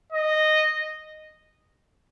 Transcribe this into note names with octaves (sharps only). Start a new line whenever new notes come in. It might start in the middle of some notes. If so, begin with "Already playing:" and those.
D#5